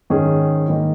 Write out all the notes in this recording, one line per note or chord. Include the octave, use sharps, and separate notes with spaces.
G#2 D#3 C#4 G#4
G#2 D#3 A#3 D#4